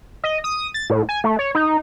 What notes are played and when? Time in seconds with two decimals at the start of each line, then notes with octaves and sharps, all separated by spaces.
0.24 D#5
0.44 D#6
0.74 A6
0.90 A2
1.09 G#5
1.24 A3
1.39 C#5
1.55 D#4